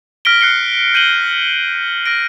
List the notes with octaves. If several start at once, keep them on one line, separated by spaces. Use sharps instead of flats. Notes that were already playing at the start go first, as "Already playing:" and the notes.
F6 A#6 B6 D7 G7
F#6 C7 C#7 G7
G6 D#7 F#7 G7
F6 A#6 D7